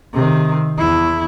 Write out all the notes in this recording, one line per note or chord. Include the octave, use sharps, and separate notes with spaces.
C3 D#3
E2 E4